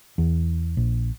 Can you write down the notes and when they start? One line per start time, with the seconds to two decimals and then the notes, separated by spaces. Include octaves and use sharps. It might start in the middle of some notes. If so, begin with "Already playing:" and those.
0.18 E2
0.77 A#1